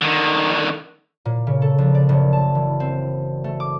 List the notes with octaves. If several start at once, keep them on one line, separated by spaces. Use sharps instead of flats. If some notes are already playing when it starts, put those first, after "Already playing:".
D3 D#3
A#2
C#3
A4
A#1
D5
F#1
A5
E3
C4
A3
D6